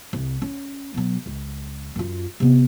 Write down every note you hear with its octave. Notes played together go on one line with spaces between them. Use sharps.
C2
C#4
B2 F#3
C#2
F#2 F4
C3 B3